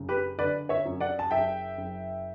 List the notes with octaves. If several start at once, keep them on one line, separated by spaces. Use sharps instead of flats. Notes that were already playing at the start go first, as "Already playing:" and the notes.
Already playing: F#1 C#3
G4 B4
D3 B4 D5
C#5 E5
F#2
D5 F#5
A5
F#1 E5 G5
F#1